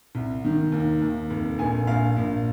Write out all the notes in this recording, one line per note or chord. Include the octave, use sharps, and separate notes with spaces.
C2
D#3
D#2
D#2
F1
A#1 G#5
A#1 F5
A#1